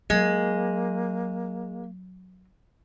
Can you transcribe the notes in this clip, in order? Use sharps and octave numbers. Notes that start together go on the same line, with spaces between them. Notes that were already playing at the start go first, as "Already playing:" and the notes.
F#3 G#3 A#3